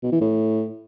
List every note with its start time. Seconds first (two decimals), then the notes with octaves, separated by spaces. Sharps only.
0.03 B2
0.12 E3
0.21 A2